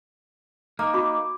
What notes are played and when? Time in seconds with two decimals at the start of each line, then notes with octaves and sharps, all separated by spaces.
0.79 A#3 D#4 D6
0.94 F#4 B5 C#6